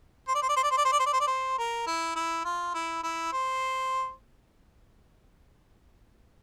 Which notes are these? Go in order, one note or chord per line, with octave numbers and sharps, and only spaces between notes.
C5
D5
C5
D5
C5
D5
C5
D5
C5
D5
C5
D5
C5
D5
C5
A#4
E4
E4
F4
E4
E4
C5